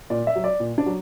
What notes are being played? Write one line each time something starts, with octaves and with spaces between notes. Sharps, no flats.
A#2 D5
E5
F#3
D5
A#2
D4
F#3